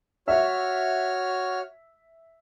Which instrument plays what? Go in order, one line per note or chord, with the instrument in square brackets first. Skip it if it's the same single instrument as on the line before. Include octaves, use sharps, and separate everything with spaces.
[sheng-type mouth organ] F#4 C#5 F6 [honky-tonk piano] E5